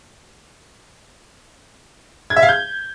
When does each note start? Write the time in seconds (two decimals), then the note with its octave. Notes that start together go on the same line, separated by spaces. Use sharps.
2.30 G#6
2.36 E5
2.43 F5
2.49 G6